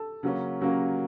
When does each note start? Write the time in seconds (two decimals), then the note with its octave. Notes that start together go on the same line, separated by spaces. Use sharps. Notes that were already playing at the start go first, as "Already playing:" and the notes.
Already playing: A4
0.23 C#3 F#3 A#3 C#4
0.61 C#3 F#3 A#3 C#4